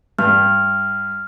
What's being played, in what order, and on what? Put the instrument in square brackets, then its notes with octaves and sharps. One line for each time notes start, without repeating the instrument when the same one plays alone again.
[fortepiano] G2 [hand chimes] F6